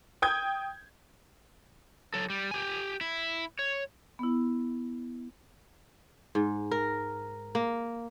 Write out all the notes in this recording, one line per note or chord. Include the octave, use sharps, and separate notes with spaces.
G5 D#6 G6 G#6
F#3 A4
G3
G4 G#5
E4
C#5
B3 E4
G#2
A#4
A#3